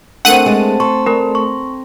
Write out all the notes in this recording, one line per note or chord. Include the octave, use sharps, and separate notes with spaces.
A3 C4 D4 A#4 F#5 D#7
G#3 A5
A4 C6 C#6
A3 A#4 A#5
C#6